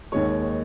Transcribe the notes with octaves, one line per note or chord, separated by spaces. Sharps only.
D#2 D#3 G#3 C#5